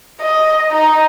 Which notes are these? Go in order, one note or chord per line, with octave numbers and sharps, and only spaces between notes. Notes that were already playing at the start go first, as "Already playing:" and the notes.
D#5
D#4